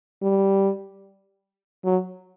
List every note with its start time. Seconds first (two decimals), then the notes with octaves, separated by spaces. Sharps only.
0.22 G3
1.85 F#3